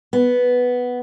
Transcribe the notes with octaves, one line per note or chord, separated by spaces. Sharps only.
B3